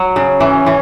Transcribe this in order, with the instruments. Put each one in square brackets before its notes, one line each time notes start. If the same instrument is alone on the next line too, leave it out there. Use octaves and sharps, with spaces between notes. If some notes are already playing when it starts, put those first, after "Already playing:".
Already playing: [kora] F#3
C#3
[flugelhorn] C#4
[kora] E3
E3